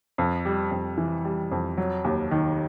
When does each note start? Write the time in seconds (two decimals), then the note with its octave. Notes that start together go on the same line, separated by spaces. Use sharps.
0.18 F2
0.45 G3
0.71 F2
0.98 E3
1.25 G3
1.51 F2
1.77 F#3
2.04 D#2
2.31 D#3